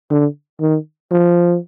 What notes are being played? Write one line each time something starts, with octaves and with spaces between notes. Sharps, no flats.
D3
D#3
F3